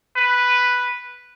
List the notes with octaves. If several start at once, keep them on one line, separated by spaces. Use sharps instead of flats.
B4